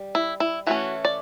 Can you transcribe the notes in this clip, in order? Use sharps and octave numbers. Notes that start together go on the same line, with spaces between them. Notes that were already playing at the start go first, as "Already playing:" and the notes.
Already playing: G3
E4
E4
E3 A3 C#4 F#4
D5